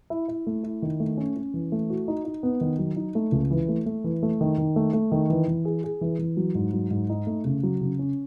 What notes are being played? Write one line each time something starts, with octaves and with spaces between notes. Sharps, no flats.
E4
E4
A3
E4
D#3
A3
C#4
C#4
E3
A3
F#4
D#4
D#4
B3
D#3
F#3
D#4
A3
C#2
E3
A3
A3
E3
A3
D#3
D#3
A3
A3
D#3
E3
E3
G#4
G#4
E3
E3
F#3
G#2
F#3
G#2
D#4
A3
C#3
F#3
C#3
C#4